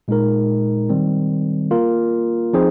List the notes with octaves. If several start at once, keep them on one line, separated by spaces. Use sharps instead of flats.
A#2 G#3 D#4 A#4
D#3 G3 C4
A#3 F4 A#4
F3 C4 D#4 G#4 C5